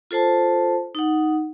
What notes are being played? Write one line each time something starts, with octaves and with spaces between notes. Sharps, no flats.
F4 A4 C5 A5
D#4 F#5